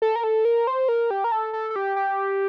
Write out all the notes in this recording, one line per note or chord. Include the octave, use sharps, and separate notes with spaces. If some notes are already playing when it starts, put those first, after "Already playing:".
A4
A#4
A4
A#4
C5
A#4
G4
A#4
A4
A4
A4
G4
G4